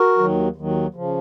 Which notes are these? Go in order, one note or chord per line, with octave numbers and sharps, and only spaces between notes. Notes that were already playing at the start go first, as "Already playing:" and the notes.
Already playing: F#4 A#4
D#2 D#3 F#3
D#2 D#3 F#3
C#3 F3